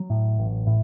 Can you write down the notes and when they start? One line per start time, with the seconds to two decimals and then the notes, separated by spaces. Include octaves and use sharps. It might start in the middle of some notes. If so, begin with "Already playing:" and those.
Already playing: F#3
0.10 A2
0.38 A1
0.67 A2